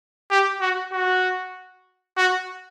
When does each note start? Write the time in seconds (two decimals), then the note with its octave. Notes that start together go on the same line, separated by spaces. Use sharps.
0.30 G4
0.61 F#4
0.92 F#4
2.17 F#4